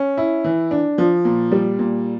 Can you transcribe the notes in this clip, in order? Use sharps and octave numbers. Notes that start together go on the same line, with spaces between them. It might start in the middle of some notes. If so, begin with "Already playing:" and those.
Already playing: C#4
E4
E3
D4
F3
A#2
G3
A#2